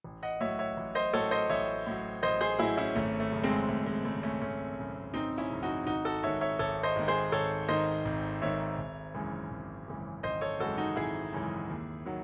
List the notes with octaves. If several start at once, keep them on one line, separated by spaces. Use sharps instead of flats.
A1
D#5 F#5
A2 F#3 C#5 E5
C#5 E5
A1
C5 D#5
A2 F#3 A4 C#5
C5 D#5
A1 C#5 E5
A2 F#3
A1 C5 D#5
G#4 C5
A2 F#3 E4 G#4
C#4 E4
G#1 A3 C#4
A3
F#2 C#3
G#3 C4
G#1 A3
G#3
F#2 C#3 A3
A3 C#4
G#1 A3 C#4
F#2 C#3
G#1 C4 D#4
C#4 E4
F#2 C#3
D#4 F#4
G#1 D#4 F#4
F#4 A4
G#2 D#3 C#5 E5
C#5 E5
G#1 A4 C#5
C5 D#5
G#2 D#3
G#4 C5
G#1 A4 C#5
G#2 D#3 C5 D#5
G#1
G#2 D#3 C#5 E5
G#1
F#2 C#3 E3 G#3
G#1
F#2 C#3 E3 G#3
G#1 C5 D#5
A4 C#5
F#2 C#3 E3 G#3 F#4 A4
D#4 F#4
G#1 E4 G#4
F#2 C#3 E3 G#3
D#2
D#3 F#3